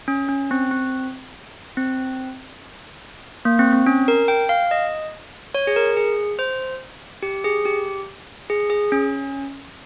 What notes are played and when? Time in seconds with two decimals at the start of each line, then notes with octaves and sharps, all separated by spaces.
0.08 C#4
0.29 C#4
0.51 C4
0.71 C4
1.77 C4
3.45 A#3
3.59 C4
3.73 C4
3.86 C#4
4.08 A#4
4.28 G5
4.49 F5
4.71 D#5
5.55 C#5
5.67 G#4
5.76 A#4
5.97 G#4
6.39 C5
7.23 G4
7.44 G#4
7.65 G4
8.50 G#4
8.70 G#4
8.92 C#4